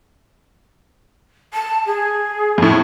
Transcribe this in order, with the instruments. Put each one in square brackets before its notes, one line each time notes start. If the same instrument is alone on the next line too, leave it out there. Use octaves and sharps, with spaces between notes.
[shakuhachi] A5
G#4
[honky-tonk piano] F2 A2